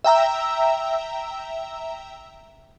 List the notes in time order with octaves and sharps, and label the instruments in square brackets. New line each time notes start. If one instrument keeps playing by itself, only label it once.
[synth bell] E5 G5 A#5 E6